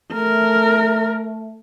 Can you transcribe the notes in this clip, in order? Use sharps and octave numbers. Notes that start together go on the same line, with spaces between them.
A3 A#4